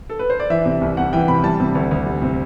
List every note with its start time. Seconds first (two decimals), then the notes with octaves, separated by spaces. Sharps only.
0.10 A4
0.19 B4
0.30 C5
0.40 D5
0.50 E3 E5
0.66 C3
0.81 C2
0.97 C2 F#5
1.13 E3 G5
1.28 C3 B5
1.44 G3 A5
1.60 C3
1.75 D2
1.91 D2
2.06 G3
2.22 C3